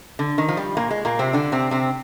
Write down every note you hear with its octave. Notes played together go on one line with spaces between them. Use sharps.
D3
D#3
F3
G3
A#2 A#3
G#3
A#2 A#3
C3 C4
D3 D4
C3 C4
C3 C4